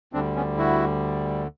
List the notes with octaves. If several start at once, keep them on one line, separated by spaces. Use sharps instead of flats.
D2 D3 G3 C4 D4
B3 C#4
E4 F#4